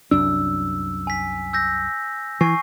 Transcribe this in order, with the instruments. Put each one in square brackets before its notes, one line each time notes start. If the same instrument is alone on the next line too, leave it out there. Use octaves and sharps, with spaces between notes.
[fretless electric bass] C2 F#2 D4 [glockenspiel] E6
[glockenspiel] G#5 B6
E6 G6 A#6
[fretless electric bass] E3 [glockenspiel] G#5 C#6 C7